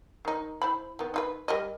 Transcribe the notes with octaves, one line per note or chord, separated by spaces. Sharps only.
D#3 D#4
E4 C5 B5
D#3 B3
D#4 F4 B4
G3 A#4 D#5